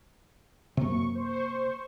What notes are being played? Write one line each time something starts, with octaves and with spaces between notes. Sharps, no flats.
F#2 C3 A#3 C#6
C5 C#6